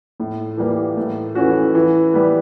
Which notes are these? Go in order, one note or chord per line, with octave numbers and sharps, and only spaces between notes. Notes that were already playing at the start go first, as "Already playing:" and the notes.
A2
E3 G3 A#3
A2
E3 A3 C#4 F#4
E3
G3 B3